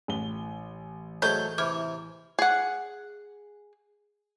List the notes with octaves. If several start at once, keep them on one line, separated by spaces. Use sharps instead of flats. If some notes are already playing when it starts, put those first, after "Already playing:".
A1 G7
F#3 A3 G#4 C5 D#5 G6
C3 E3 D6 F6 G#6
G#4 F#5